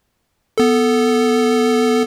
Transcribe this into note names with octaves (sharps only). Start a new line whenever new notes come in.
B3 A4